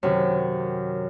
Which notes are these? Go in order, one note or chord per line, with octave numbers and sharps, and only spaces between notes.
F#2 C3 D#3